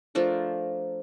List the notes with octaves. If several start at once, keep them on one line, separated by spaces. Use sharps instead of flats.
F3 A3 D4 A#4